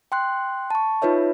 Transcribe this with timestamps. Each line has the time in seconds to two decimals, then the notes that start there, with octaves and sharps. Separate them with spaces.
0.12 G5 C6 F#6
0.70 A5 C#6
1.02 D#4 F4 B4 C#5 E5